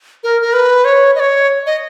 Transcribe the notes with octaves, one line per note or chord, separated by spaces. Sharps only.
A#4
A#4
B4
C#5
D#5
C#5
D#5